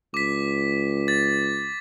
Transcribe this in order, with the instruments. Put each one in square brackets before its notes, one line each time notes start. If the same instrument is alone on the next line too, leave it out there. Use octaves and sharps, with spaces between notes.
[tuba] C#2 [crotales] D6 B6
[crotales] A6